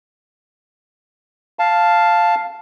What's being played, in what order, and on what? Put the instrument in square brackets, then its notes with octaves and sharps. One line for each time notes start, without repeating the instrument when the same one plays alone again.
[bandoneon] F5 A5